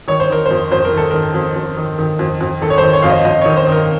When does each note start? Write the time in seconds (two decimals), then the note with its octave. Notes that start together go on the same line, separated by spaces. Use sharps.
0.08 D#3 C#5
0.20 C5
0.30 D#3 A#4
0.46 C5
0.51 F2
0.72 F2 C5
0.85 A#4
0.93 D#3 A4
1.11 D#3 A#4
1.34 F2
1.56 F2
1.77 D#3
1.99 D#3
2.19 F2
2.41 F2
2.62 D#3 A4
2.70 C#5
2.78 D#3 C5
2.93 C#5
3.03 F2 F5
3.10 D#5
3.25 F2 D#5
3.41 D#3 C#5
3.57 C5
3.67 D#3
3.72 A#4